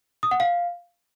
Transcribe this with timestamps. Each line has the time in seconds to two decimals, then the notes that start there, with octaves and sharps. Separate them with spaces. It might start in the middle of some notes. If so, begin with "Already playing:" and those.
0.23 D#6
0.31 F#5
0.40 F5